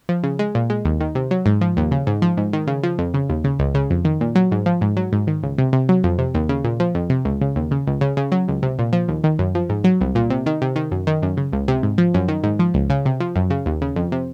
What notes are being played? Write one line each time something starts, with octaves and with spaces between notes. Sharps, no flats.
F3
C#3
G#3
A#2
G#3
D#2
D#3
C3
F#3
G#2
F3
D#2
C#3
G#2
F3
G#2
D#3
C#3
F3
F2
C#3
D#2
C#3
C#2
C#3
F2
D#3
A#2
F#3
G#2
F3
G#2
F#3
G#2
D#3
C#2
C3
C3
F#3
F2
C3
D#2
C#3
A#2
F3
F2
C3
C#2
C#3
D#2
C#3
C#2
C#3
C#3
F#3
C#2
C3
A#2
F3
D#2
D#3
F#2
F3
G#2
F#3
C2
A#2
C3
D#3
C3
D#3
F#2
D#3
F#2
C#3
C#2
C3
G#2
F3
F#2
D#3
G#2
F3
C#2
C#3
C3
F3
F#2
C#3
D#2
C#3
F2
C3